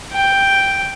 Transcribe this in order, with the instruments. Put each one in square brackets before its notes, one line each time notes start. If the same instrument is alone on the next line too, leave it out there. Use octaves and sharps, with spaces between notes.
[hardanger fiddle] G5